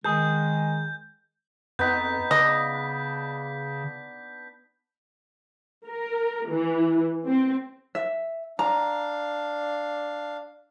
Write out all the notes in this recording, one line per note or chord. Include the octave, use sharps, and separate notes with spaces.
D#3 G#3 G#4 G6
F2 B3 D#4 G6 B6
C#3 D4 D#5
A#4
E3
C4
E5
D4 F5 A#5